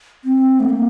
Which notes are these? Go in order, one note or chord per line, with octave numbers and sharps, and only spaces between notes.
C4
A3
A#3